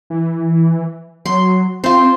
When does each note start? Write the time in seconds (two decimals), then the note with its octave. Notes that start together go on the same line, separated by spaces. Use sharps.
0.10 E3
1.26 F#3 C6
1.84 C4 F4 C5